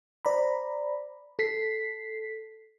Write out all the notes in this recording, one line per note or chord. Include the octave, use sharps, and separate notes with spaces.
C5 D5 A#5 B5
A4 B6 C7